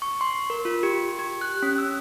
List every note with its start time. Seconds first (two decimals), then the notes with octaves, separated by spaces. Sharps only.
0.02 C#6
0.21 C6
0.50 A#4
0.65 F4
0.83 G4
1.19 G4
1.41 F#6
1.62 C#4
1.78 E6